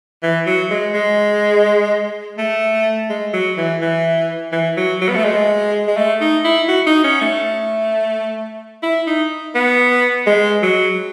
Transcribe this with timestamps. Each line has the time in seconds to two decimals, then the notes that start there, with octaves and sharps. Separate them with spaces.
0.23 E3
0.46 F#3
0.70 G#3
0.94 G#3
2.38 A3
3.10 G#3
3.34 F#3
3.57 E3
3.81 E3
4.52 E3
4.77 F#3
5.01 F#3
5.09 B3
5.16 A3
5.25 G#3
5.87 G#3
5.97 A3
6.21 D#4
6.44 E4
6.68 F#4
6.86 D#4
7.04 C#4
7.21 A3
8.83 E4
9.07 D#4
9.55 B3
10.26 G#3
10.62 F#3